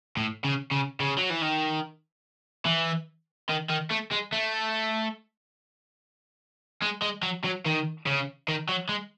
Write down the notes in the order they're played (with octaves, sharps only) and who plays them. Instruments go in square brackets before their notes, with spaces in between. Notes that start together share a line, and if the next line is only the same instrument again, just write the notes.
[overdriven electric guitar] A2
C#3
C#3
C#3
F#3
E3
D#3
E3
D#3
D#3
A3
G#3
A3
G#3
G#3
F#3
F#3
D#3
C#3
D#3
F#3
G#3